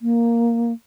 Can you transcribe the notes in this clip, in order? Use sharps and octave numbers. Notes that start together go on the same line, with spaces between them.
A#3